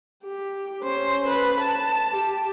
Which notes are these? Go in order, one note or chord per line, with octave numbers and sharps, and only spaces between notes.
G4
C#4 C5
B4
A5
G4